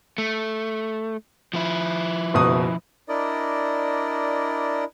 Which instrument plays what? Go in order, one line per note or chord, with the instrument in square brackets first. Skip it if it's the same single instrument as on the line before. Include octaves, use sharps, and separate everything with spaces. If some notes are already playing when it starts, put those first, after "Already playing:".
[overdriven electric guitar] A3
F3 E4
[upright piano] F#1 B2 D#6
[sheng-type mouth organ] D4 E4 A#4 D5 D#5